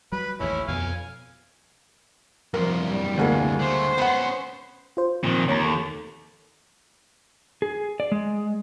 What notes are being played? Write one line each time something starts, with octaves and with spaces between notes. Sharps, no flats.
F#3 G3 B4
A1 D#2 C#4 E4
F2 B2 F3 F5 G#5
C2 F#2 F3 A#4
G3
D2 G#3 A#3
D3 A3 C5
B3 C#4 F#5 B5
F4 C5
A#2 D#3 F3 C4
D#2 C#5 A#5
A4
G#4
D5
G#3